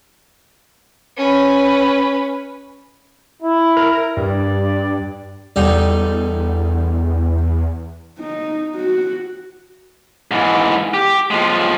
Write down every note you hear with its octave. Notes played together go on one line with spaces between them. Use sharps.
C#4 B4
E4
A#4
G2 D5
E2 D3 G3 D#4
D#4
F#4
G#2 E3
G4
F3 G#3